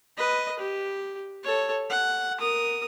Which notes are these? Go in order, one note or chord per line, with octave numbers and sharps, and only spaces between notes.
B4 D#5
G4
A4 C#5
F#5
A#4 D#6